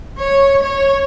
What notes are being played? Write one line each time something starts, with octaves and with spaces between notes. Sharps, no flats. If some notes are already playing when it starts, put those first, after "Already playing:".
C#5
C#5